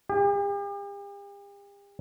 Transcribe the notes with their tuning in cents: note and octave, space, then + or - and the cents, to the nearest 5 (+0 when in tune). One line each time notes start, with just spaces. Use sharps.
G4 +45